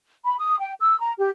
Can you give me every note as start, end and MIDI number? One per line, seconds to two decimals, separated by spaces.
0.25 0.35 83
0.39 0.56 87
0.59 0.72 79
0.79 0.97 88
1.00 1.12 82
1.19 1.29 67